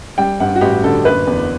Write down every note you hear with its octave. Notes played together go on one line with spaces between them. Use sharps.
G3 G5
G2 F#5
F#4
A1 G4
D3 A4
F#1 B4
E2